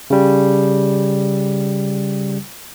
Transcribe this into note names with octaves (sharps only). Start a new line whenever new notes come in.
C#3 G3